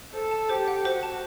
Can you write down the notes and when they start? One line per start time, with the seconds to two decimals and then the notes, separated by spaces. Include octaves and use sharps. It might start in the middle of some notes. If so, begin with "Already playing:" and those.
0.13 A4 C5
0.31 A5
0.49 G4 C5
0.68 F#5
0.84 F#4 C5
1.03 A5